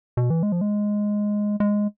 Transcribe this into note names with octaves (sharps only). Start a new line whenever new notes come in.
B2
E3
G#3
F3
G#3
G#3